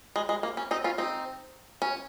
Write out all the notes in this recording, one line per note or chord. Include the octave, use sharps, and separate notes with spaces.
G#3
G#3
A#3
C#4
C4 D#4
C#4 F4
C4 D#4
C#4